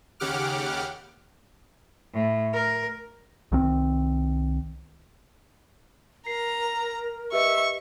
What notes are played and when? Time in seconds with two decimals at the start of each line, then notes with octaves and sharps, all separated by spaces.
0.20 D#2 C#3 G4 F#5 D6 F6
2.14 A2
2.53 A#4
3.52 C2 D#3 C4
6.27 A#4 A#5 C7
7.32 G4 B4 D#5 E5 C#6